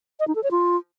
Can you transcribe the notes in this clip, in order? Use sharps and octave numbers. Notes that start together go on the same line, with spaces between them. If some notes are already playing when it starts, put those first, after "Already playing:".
D#5
D#4
A4
C#5
F4